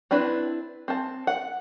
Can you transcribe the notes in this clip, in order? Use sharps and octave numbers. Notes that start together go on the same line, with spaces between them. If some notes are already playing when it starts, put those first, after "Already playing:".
C4 D4 E4 B4
C4 A5
F#5